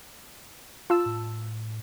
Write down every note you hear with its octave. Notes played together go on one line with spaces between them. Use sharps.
F4 A5 E6
A2